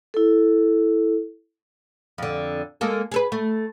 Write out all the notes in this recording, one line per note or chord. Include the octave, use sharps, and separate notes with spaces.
E4 A4
F2 D3
G#3 A#3 A4
G#4 A4 B4
A3